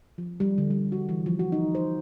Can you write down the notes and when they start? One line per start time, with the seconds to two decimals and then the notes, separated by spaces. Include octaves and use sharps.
0.18 F3
0.40 G3
0.58 D3
0.71 G3
0.92 F#4
1.09 E3
1.26 F3
1.39 F#4
1.52 D#4
1.75 C5